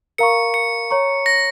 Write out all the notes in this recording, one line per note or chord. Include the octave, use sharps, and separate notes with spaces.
A#4 F5 A#5 C#6 C#7
C#7
C#5 A#5 C#6
A#6